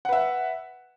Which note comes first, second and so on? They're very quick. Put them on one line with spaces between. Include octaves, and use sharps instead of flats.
F#5 B4 E5